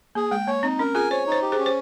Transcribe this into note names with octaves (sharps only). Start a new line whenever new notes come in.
A#3 G#4
G#3 G5
A#3 C#5
C4 D#4
C#4 A#4
F4 G#4 G#5
C5 C#5
D#4
C5
G4
G#4 C5
C#4
C5